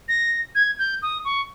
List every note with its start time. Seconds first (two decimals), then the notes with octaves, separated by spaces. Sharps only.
0.09 A#6
0.55 G#6
0.79 G6
1.02 D#6
1.25 C#6